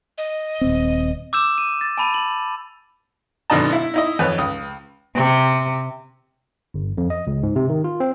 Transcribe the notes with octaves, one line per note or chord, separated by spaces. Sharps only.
D#5
D#1 C4
D6 E6 G6 E7
D#7
A6
G#5 A5 B5 D#7 F7
F#7
G#1 F#2 B2 D3 D#5 A5
E4
D#4 E4 D#5
F2 B4 C#5
C#2 D#6
C3
G1
F2
D#5
C#2
G#2
C3
D#3
F4
C4